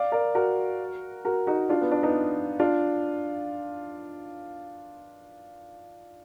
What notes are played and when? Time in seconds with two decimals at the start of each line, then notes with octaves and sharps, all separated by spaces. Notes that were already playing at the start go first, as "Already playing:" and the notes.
Already playing: D5 F5
0.12 A#4 D5
0.35 F#4 A#4
1.25 F#4 A#4
1.47 D#4 F#4
1.69 D4 F4
1.81 B3
1.92 D4
2.03 B3 D#4
2.60 D4 F4